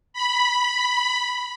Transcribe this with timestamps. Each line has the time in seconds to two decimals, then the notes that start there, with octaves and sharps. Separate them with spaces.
0.13 B5